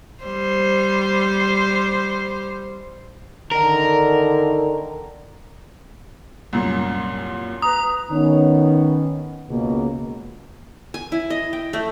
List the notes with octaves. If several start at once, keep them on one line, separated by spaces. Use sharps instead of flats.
G3 C5
D3 D#3 A#4
C2 F#2 A#2
B4 A#5 D#6
D#3 B3 C#4
C#2 B2 A#3
G#5
E4
D#5
G5
A3